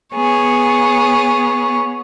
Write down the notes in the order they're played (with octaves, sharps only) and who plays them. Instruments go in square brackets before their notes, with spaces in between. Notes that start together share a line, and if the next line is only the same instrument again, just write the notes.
[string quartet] B3 G#4 C#5